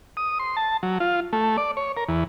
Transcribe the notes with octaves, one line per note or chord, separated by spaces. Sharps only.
D#6
C6
A5
F#3
F4
A3
D5
C#5
A#4
E2